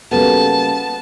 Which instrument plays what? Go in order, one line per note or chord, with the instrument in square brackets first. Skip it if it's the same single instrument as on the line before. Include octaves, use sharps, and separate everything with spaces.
[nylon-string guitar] C#3 G3 A#3 [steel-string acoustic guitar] B3 [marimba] F#4 A4 B4 [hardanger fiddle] A5